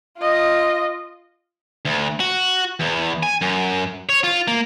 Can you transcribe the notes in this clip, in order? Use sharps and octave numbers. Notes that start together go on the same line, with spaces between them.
F4 D#5
D2
F#4
E2
G#5
F#2
C#5
F4
A#3